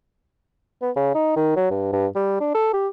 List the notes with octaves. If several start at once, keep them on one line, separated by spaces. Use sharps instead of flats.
B3
C#3
D#4
D#3
F#3
G2
G2
G3
D4
A4
G4